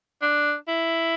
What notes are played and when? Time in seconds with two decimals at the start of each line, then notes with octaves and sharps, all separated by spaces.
0.22 D4
0.68 E4